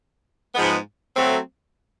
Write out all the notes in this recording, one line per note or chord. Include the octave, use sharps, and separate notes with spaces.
G#2 F3 G#3 B3
F#3 A3 C4